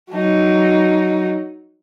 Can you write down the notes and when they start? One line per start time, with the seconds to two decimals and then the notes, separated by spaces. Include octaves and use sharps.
0.12 F#3 D#4